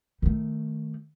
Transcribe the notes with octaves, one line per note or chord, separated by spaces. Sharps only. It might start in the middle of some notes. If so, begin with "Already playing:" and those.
D#3 A3